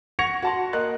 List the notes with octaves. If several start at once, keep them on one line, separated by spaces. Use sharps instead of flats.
F#5 C#6 G#6 A#6 C#7 F7
F#4 A5 C6
A#3 A#4 D#5 F#6